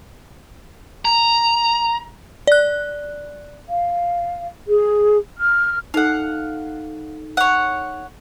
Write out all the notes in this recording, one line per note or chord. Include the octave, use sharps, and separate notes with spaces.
A#5
D5 F#6
F5
G#4
F6
D#4 A4 F5 F#5
C#5 F#5